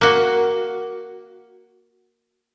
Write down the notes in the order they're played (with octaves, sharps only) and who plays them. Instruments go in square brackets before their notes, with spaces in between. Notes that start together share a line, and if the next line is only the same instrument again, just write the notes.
[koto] A#3 F#4